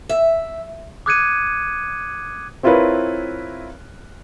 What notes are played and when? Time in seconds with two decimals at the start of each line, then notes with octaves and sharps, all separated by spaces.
0.09 E5
1.06 D6 D#6 F#6 G#6 C#7 D#7
2.63 C4 E4 F4 A#4 B4 C#5